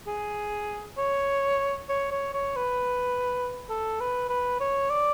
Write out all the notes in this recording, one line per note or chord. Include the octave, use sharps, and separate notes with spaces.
G#4
C#5
C#5
C#5
C#5
B4
A4
B4
B4
C#5
D5